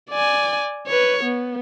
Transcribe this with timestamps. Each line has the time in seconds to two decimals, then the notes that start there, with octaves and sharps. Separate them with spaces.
0.10 D5 G#5
0.87 B4 C#5
1.24 B3